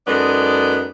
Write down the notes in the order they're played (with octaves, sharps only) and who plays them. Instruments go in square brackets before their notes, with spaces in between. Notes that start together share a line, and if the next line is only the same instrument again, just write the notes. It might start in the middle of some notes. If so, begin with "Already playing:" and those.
[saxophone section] F#2 G#3 B3 D#4 A4 D5